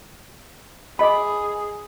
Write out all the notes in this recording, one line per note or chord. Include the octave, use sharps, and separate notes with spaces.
G#4 D#5 B5 C6 D6